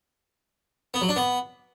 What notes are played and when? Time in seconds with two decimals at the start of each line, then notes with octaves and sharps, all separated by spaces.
0.94 B3
1.01 F#3
1.09 D4
1.16 B3